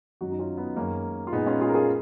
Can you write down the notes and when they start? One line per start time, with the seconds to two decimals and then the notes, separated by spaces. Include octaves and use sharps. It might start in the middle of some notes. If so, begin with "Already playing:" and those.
0.21 F#2 D#3 F#3 D#4 F#4
0.32 D#4
0.39 C#4 F4
0.57 B3 D#4
0.77 F#2 D#3 G#3 A#3 C#4
1.27 F4
1.32 A#2 G#3 B3 D#4
1.47 C#4 F4
1.61 F4 G#4
1.69 A#4
1.74 F4 G#4